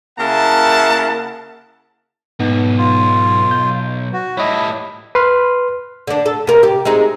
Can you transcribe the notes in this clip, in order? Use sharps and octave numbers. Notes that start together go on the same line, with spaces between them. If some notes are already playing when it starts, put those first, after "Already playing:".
C#3 A#3 E4 A#4 F#5 A5
B1 G#2 B3 D#4
F4
G6
F#4
A2 G3 E4 C#5 D#5
B4 C6 F6
D3 D4
A4
C3 A#4
G4
G#3 C4 D#4